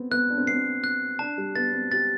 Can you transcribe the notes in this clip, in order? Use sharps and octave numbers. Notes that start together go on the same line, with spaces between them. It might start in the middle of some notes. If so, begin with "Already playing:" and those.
Already playing: B3 C4
B3 F#6
D4
C4
B3 C7
C4
F#6
D4 A5
G3
B3 A6
C4
G4 A6